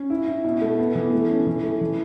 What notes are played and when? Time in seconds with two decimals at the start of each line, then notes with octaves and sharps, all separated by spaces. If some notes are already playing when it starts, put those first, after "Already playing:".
Already playing: C#4
0.10 E4
0.28 E4
0.45 B2
0.61 A3
0.79 B3
0.95 E3
1.13 A3
1.30 C#4
1.47 E3
1.63 A3
1.81 E3